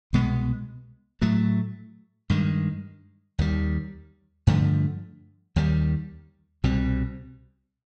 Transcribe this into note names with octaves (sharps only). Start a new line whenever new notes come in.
C2 B2 G#3 B3
A2 F#3 A3
G2 D#3 G#3
D#2 D#3 G3
G2 D3 F3 A3
D#2 D#3 G3
C2 B2 G3 C4